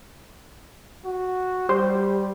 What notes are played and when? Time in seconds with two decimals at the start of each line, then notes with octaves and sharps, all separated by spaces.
1.05 F#4
1.69 G3 G4 C5